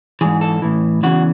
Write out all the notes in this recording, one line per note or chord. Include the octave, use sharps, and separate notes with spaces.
G#2 E3 G#4
A4
A2 E3
E2 C#3 E3 F#4